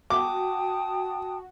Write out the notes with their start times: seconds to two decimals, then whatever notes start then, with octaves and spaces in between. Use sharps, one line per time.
0.10 F#4 G5 A5 D6 D#6